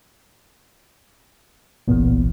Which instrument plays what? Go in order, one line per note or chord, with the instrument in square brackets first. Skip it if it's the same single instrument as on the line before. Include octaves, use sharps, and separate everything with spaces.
[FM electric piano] G1 C2 E3 [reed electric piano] A#2 B3